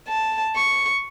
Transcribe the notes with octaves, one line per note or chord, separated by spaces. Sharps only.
A5
C#6